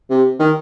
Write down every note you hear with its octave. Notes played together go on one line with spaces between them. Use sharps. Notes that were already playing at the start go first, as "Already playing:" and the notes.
C3
D#3